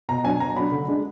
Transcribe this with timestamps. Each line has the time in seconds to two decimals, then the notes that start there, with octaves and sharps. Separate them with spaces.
0.09 B2 A#5
0.24 F#3 D4 G#5
0.40 B2 A#5
0.56 F#3 D4 B5
0.72 D3
0.88 G#3 D4